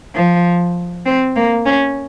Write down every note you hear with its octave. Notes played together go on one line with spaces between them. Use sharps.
F3
C4
A#3
C#4